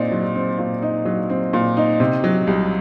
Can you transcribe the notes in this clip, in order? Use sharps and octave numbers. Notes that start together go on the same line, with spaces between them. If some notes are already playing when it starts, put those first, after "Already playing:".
Already playing: A#2 C4 D#4 D5
F#3
C4
A#2
D#4
F#3
C4
A#2
D#4
C3
F#3
C2